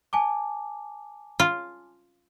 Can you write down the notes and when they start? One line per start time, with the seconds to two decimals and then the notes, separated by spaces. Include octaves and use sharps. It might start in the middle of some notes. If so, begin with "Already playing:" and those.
0.13 G#5 A5 D6
1.40 F4